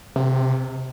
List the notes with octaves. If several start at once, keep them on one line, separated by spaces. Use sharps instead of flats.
C3